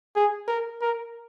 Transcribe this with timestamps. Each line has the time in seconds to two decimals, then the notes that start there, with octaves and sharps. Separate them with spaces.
0.16 G#4
0.48 A#4
0.81 A#4